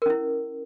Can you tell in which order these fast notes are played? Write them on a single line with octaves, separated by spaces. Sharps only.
A#4 C#4 E4